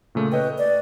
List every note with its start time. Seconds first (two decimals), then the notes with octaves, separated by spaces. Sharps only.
0.15 A#2 C#3 A3
0.32 B4 C#5 D#5 G5
0.58 D5